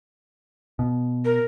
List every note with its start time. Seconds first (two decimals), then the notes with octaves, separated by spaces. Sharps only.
0.79 B2
1.25 A#4